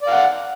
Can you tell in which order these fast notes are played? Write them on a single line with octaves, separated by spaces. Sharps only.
D5 F5 F#5